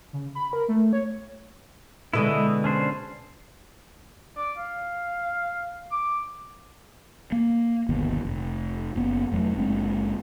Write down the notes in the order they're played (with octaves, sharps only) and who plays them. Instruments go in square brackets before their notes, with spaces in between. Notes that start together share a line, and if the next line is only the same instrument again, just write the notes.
[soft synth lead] C#3
B5
A#4
A3
C#5
[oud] B2 D3 G#3 [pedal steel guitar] E4 D#5
[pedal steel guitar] C#4 D4 C5
[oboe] D5
F5
D6
[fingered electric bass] A#3
G1 D#2 B2
F1
F#1 B3
F1 F2 F#3 A3
F#1 G#3 C4 D4